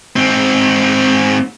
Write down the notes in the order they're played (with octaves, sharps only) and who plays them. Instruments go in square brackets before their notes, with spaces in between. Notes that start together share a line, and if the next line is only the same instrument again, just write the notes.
[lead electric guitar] G#2 C4